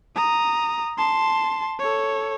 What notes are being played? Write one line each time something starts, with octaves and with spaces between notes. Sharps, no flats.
A#5 D#6
A5 C6
A4 C#5